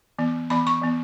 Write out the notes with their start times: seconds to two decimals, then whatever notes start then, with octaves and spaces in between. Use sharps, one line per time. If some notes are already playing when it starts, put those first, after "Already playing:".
0.19 E3 B3
0.50 E3 B3 B5
0.67 C#6
0.81 E3 B3